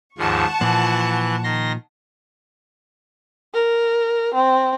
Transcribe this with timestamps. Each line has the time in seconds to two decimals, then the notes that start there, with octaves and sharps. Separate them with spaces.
0.18 D#2 G#2 F3 F#5 A5 C#6
0.61 A#2 E3 F3 F#6
1.44 D#3 C6 A#6
3.54 A#4
4.34 C4